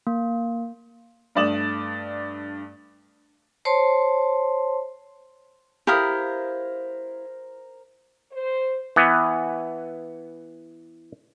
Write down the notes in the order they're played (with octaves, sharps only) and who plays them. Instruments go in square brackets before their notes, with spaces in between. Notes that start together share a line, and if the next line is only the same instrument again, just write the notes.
[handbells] A#3
[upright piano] G2 A3 D5 D#6 E7 F#7
[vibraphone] C5 C#5 A5 C6
[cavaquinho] E4 F5 D#6 [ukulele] G4 [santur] A#4 C5
[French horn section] C5
[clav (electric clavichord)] E3 B3